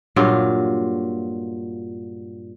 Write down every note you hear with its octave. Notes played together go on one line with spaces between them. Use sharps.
G2 A#2 F#3 F4